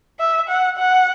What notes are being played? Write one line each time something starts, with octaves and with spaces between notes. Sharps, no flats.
E5
F#5
F#5